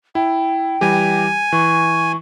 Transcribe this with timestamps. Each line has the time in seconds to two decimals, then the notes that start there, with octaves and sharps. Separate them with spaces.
0.15 E4 G5
0.81 E3 G3 G4 G#5
1.53 E3 C#6